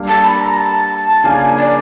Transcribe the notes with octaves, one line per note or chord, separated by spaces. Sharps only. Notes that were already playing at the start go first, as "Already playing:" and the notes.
Already playing: G3 A#3 D4
A5
B5
A#5
A5
C#3 F3 A#3 D4 G#5
D5